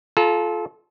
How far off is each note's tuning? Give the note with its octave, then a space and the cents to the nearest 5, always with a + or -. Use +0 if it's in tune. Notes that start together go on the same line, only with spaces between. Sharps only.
F4 +0 A4 -30 A#5 -5